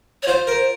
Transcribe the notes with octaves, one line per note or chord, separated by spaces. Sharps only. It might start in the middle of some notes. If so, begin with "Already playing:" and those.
C#5
F4 C5
A#4